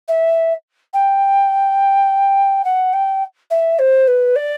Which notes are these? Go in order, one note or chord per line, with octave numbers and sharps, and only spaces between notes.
E5
G5
F#5
G5
E5
C5
B4
D5